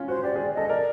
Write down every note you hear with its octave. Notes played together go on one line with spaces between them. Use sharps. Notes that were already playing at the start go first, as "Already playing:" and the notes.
Already playing: C#4 F4
F#4 C5
G4 D5
G#4 D5
A4 D#5
A#4 D5